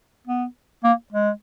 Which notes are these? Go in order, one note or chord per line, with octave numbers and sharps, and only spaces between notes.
B3
A#3
G#3